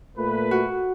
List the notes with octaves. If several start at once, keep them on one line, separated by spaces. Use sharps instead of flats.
A#2 A3 B4
F#4